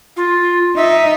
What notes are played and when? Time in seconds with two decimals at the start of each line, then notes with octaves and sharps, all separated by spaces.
0.16 F4
0.76 D#4 E5